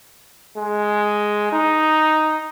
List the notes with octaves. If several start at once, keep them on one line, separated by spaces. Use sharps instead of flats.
G#3
D#4